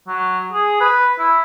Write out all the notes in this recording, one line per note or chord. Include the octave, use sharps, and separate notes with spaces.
F#3
G#4
B4
E4